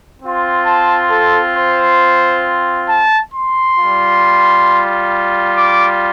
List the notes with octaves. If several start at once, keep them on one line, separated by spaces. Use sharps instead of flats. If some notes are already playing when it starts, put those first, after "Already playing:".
C4 F4
A5
A4
C5
A5
C6
G3 F4
D6